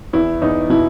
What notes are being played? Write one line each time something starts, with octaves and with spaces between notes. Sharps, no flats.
E2 E4
E2 D#4
B2 E4